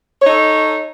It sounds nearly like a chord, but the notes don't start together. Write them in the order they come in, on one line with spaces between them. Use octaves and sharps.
C#5 D#4 A4